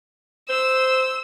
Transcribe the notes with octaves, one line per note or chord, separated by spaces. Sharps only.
C5 E6